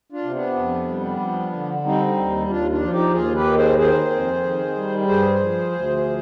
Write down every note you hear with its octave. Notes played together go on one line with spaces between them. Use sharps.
D4 F4
C3
B3 D4
F2
G3
F3
D3
G3 C4 D#4
D#2
D#2 D4 F4
D4 F4
F3 F4
D#4 G4
D#2 F4 G#4
G4 B4
D#3
G#4 C5
D#3 G#4 C5
F2
D#3
G3
G2 G#4 C5
F3
D2
F3